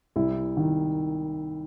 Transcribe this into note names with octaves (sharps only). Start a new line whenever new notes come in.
C2 E4
D#3